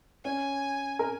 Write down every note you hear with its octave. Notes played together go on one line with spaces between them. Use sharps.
C#4 G#5
A#4